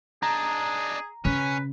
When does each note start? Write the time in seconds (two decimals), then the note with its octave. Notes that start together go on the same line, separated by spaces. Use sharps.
0.23 D4 D#4 G#4 A#5
1.25 C#3 C#4 B4